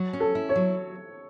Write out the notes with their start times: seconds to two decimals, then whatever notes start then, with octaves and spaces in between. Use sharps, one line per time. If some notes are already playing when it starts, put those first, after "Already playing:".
Already playing: F#3
0.13 C#4
0.20 A4
0.35 E4
0.49 C#5
0.56 F#3